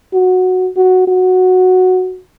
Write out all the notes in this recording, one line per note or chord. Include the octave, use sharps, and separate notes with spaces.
F#4
F#4
F#4